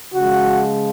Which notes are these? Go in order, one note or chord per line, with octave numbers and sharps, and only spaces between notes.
C#3 F3 G#3 F#4